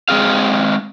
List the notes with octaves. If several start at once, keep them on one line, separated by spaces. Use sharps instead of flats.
G#3 C4 G#4 F5